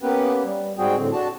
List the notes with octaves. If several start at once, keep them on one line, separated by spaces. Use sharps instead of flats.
A#3 B3 C#4 G4 B4
G3
G#2 G3 C4 F#4 G#4 G5
A2 D3 C4
D4 F#4 A5